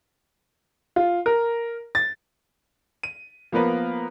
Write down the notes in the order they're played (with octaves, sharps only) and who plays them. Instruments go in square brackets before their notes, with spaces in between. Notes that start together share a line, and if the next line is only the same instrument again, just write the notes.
[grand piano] F4
A#4
A6
D#7
F3 A#3 B3 A#4 B4